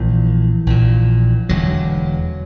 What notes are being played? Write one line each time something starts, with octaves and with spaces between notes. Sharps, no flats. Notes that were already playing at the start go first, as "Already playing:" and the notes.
Already playing: A#1 A#2 E3
A#1 A#2
E1 E2 D3 F#3